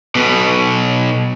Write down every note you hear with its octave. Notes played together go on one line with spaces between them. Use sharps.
B1 B2